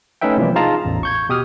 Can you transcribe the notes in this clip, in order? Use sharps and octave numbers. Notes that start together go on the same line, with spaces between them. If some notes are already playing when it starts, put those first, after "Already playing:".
A3 C#4 D#4 B4 E5 G5
C3 E3 F3 G3 A#3
D#4 F4 G#4 F5 A5 A#5
A1 E2
C#6 G6 G#6
B2 G4 D#6 F6